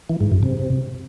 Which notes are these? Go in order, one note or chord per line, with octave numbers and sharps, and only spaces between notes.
E3
G#2
F#2
C3